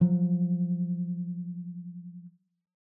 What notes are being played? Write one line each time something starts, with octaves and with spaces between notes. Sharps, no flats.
F3 F#3